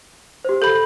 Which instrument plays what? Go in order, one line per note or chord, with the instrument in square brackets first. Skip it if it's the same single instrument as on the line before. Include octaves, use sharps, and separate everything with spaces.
[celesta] G4 C5
[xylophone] A4 B5 [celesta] G6